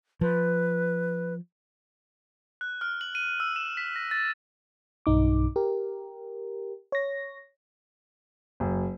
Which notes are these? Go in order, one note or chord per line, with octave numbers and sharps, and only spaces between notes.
F3 B4
F#6
F6
F#7
D#7
E6
E7
B6
A#6
A6
B1 G2 D#4 D6
G4 A#4
C#5 A#6
F#1